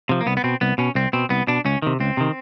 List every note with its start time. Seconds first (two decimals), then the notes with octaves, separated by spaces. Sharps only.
0.09 C3 F3
0.21 A#3
0.26 C2 B3
0.37 B3
0.44 B2 C4
0.61 C2 B3
0.78 B2 C#4
0.95 C2 C4
1.13 B2 C4
1.30 C2 B3
1.48 B2 D4
1.65 C#2 C#4
1.82 C3 D#3
2.00 C#2 C4
2.17 C3 D#3